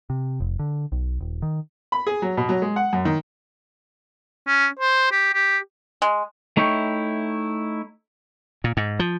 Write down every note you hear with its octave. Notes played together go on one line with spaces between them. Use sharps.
C3
F1
D3
B1
D#1
D#3
B5
G#4
F#3
B2
F#3
G#3
F#5
F#2
D#3
C#4
C5
G4
G4
G#3
A3 D#4 E4 C#5 G5
A#2
G#2
F3